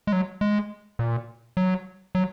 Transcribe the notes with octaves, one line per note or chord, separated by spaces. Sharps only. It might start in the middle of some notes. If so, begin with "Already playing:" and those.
G#3
F#3
G#3
A#2
F#3
F#3